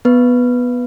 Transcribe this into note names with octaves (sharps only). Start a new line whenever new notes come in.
B3 B4